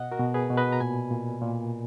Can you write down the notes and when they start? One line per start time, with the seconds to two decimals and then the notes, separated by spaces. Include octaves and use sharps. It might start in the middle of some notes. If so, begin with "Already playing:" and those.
Already playing: B2 D#5 F#5
0.11 F#4 A#4
0.20 B2
0.34 G#4 B4
0.50 B2
0.57 B4 D#5
0.73 A#5
0.80 A#2 G#5 B5
1.11 A#2
1.42 A#2